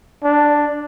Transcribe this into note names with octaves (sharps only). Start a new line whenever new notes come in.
D4